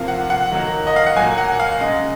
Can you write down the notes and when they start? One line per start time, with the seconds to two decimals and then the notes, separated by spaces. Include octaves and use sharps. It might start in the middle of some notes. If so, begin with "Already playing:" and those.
Already playing: C3 F3 A#3 F5
0.08 F#5
0.30 F#5
0.52 D#3 F#3 A#3
0.87 D#5
0.96 F5
1.06 F#5
1.16 A#2 F#3 A#3 G#5
1.38 F#5
1.60 F5
1.81 C#3 G#3 D#5